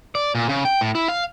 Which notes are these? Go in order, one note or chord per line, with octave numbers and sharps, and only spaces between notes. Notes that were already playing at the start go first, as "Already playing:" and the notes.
D5
A#2
C#3
G5
A2
E4
F5